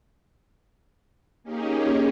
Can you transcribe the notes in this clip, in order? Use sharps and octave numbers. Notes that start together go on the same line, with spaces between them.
A#3 C#4 D#4 G4 G#4